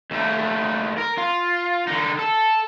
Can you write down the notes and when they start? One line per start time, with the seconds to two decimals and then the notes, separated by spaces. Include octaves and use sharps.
0.11 D#2 A3
0.98 A#4
1.18 F4
1.88 D3 D#4
2.19 A4